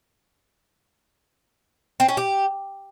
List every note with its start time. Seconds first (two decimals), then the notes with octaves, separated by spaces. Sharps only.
2.00 C4
2.08 C#4
2.17 G4